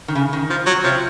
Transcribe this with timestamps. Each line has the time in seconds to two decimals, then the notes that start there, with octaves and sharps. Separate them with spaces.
0.08 D#3
0.15 C#3
0.33 D#3
0.50 F3
0.66 F#3
0.84 C3 F3